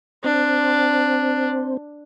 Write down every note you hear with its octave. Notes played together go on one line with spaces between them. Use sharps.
C4 D4